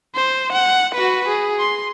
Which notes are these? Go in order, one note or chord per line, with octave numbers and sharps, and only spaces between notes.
C5
F#5
F#4 B4
G#4
C6